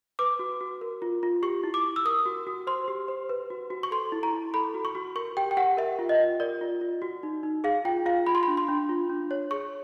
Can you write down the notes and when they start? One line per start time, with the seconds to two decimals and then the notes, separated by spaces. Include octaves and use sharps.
0.19 B4 D6
0.39 F#4
0.61 F#4
0.81 A#4
1.02 F4
1.23 F4
1.43 G4 C#6
1.64 E4
1.74 D6
1.85 E4
1.96 E6
2.05 A#4 D#6
2.26 F#4
2.47 F#4
2.67 C5 C6
2.88 G4
3.08 C5
3.29 B4
3.50 F#4
3.70 F#4
3.83 C#6
3.91 A4 C6
4.12 E4
4.23 A#5
4.33 E4
4.54 A4 B5
4.74 F#4
4.85 C#6
4.95 F#4
5.16 A#4 C#6
5.37 G4 G5
5.51 G5
5.57 G4 F#5
5.77 A#4 E5
5.99 F4
6.09 D#5
6.20 F4
6.40 A#4 D5
6.61 F4
6.81 F4
7.02 F#4
7.23 D#4
7.43 D#4
7.64 G#4 F5
7.85 F4 G5
8.06 F4 F5
8.27 F4 B5
8.35 C6
8.43 B5
8.48 D4
8.57 C6
8.68 D4
8.89 F4
9.09 D4
9.31 C#5
9.51 G#4 C#6